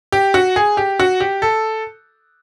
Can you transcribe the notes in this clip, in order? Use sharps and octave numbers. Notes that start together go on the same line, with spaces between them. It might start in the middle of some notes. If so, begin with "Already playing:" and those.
G4
F#4
G#4
G4
F#4
G4
A4